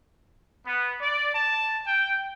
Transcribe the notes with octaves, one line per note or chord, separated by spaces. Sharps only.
B3
D5
A5
G5